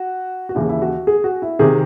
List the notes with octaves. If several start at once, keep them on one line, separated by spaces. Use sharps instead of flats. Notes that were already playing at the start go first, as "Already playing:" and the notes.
Already playing: F#4
F#4
D#2 C#3 E3 E4
E4
F#4
G#4
F#4
E4
C3 D#3 G#4